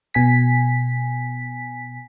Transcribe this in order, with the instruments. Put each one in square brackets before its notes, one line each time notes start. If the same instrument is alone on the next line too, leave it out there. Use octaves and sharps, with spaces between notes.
[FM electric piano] B2 G#5 B6